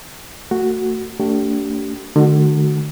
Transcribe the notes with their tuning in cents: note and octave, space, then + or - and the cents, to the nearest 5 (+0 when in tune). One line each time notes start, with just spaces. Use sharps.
A3 +30 F#4 +0
A3 +20 D4 -35 G4 -30
D3 +35 A3 -30 F#4 +0